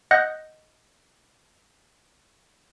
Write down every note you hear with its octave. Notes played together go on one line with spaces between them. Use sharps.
D#5 F#5 F#6 G6 A#6